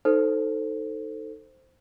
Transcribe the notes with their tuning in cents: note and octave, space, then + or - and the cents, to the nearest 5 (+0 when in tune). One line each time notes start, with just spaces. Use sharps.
D#4 +0 A4 +15 C5 +0